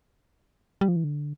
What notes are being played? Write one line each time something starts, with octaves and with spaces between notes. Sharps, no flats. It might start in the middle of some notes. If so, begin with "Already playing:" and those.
G3
F3
E3
D3